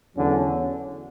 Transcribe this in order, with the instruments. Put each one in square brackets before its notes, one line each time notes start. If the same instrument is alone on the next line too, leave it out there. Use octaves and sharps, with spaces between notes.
[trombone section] E2 D3 F#3 C#4